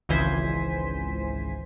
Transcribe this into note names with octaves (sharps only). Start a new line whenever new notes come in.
G#1 C#2 E3 C5 G#5 B6